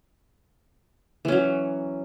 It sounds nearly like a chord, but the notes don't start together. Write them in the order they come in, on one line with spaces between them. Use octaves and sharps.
E3 C#4 F#3